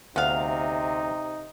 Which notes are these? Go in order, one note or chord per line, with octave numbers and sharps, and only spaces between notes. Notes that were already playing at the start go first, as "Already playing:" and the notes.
D2 C3 B3 D#4 F5